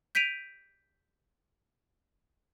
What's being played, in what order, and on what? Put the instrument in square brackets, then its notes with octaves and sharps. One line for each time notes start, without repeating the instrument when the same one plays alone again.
[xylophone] G6 B6 D7 D#7 F7